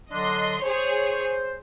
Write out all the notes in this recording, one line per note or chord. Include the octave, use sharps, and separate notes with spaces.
D3 F#3 D4 D#5 C6
G#4 C5 C#5